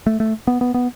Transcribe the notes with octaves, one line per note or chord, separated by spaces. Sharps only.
A3
A3
B3
B3
B3